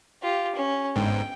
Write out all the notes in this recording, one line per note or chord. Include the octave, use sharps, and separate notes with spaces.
F4 G4
C#4
G1 G#2 G5